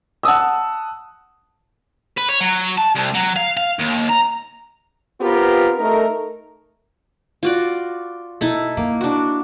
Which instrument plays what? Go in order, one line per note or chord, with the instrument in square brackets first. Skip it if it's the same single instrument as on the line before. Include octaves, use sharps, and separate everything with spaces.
[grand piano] F#5 A5 D#6 E6
[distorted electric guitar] B4
C#5
F#3
A5
C2
F#3
F5
F5
D#2
A#5
[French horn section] B3 C4 F4 G4 A#4 B4
A3 D#4 A#4
[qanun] F4 F#4 D5
[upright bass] B2 [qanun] D#4 E4 A4
[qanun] A#3 [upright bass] E4
[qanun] D4 F#4